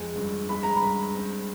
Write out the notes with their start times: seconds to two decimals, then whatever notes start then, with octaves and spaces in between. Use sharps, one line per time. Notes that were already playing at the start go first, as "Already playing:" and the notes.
Already playing: F2 G#3
0.16 G2
0.49 G#3 B5
0.63 A#5
0.76 B5
0.82 G2
1.15 C4